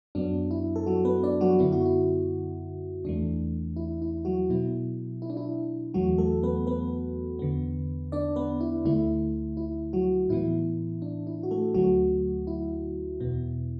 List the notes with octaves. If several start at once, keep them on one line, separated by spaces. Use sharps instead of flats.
F#2 F#3 B3 D4
E4
A4
F#3 F#4
B3 B4
D4 D5
F#3 F#4
F#2 D3 B3 E4
F#4
E4
E2 E3 A3 D4
E4
E4
F#3 F#4
B2 F#3 B3 E4
E4
D4
E4
E2 E3 F#3 A3 F#4
A3 A4
B3 B4
B3 B4
E2 D3 B3
D4 D5
B3 B4
E4
D2 D3 A3 E4
E4
F#3 F#4
A2 E3 B3 E4
D4
E4
F#4
A3 A4
D2 D3 F#3 A3 F#4
E4
E2 B2 B3